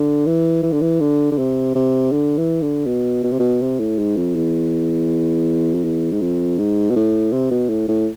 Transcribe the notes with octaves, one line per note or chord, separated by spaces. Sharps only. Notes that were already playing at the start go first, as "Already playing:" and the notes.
Already playing: D3
E3
E3
D3
E3
D3
D3
C3
C3
D3
E3
D3
B2
B2
C3
B2
C3
A2
G#2
F2
E2
F2
E2
G#2
F2
G#2
B2
A2
C3
B2
A2
A2